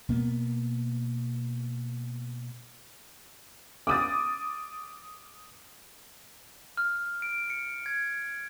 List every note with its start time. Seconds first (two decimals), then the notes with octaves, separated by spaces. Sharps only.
0.09 B2 A#3 B3
3.87 D6 D#6 A6
6.77 F6
7.22 D7
7.50 C#7
7.86 G#6